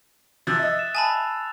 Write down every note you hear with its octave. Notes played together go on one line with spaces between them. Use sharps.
C3 F3 E6 F#6 A6
D#5 E5
E7
G#5 A5 B5 D#6 E7